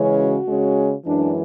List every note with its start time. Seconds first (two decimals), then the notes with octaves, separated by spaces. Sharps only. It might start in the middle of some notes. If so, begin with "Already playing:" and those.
Already playing: C#3 E3 G#3 C#4
0.20 F#4
0.48 C#3 G#3 C#4
1.05 F#2 E3 G#3 D4